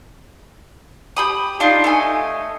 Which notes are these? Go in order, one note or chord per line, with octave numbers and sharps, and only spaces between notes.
G4 B5 D#6
D4 D#4 F4 D#5
A3 D#5 G#5